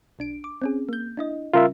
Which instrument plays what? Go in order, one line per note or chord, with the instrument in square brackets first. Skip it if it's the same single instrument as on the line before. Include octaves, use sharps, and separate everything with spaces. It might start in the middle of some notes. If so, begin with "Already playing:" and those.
[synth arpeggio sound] B1 D4 D7
D6
C4 C#4 G#4
A#3 G6
D4 E4 D#5
[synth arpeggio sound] C#3 G3 C#4 [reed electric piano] F4 A#4 E5